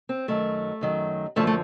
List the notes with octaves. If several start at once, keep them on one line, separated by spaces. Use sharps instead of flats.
C4
F#2 D#3 F#3 A3
F#2 D#3 F#3
F#2 D3 F3 A3
A3